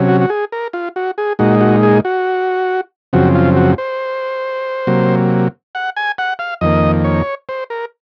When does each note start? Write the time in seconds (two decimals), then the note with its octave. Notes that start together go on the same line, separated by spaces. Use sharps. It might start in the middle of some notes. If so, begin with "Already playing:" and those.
Already playing: C3 F#3 C#4
0.08 F#4
0.21 F#4
0.30 G#4
0.52 A#4
0.73 F4
0.96 F#4
1.18 G#4
1.39 A#2 G#3 D#4 F#4
1.61 F#4
1.83 G#4
2.05 F#4
3.13 F#2 C#3 F3 C4 F#4
3.35 F4
3.57 F#4
3.78 C5
4.87 C3 F#3 A#3
5.75 F#5
5.96 G#5
6.18 F#5
6.39 F5
6.61 F2 D#3 A#3 D#5
7.04 C#5
7.49 C5
7.70 A#4